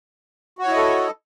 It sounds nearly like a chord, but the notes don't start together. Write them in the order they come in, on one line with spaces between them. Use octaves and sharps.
F#4 C#5 E4 D#5 A4